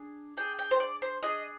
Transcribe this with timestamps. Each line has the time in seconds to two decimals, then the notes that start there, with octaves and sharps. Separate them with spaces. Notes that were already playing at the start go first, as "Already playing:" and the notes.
Already playing: D4 G#4
0.37 D4 G#4 G5
0.59 G5
0.71 C5
0.80 D5
1.02 C5
1.23 D4 G#4 D#5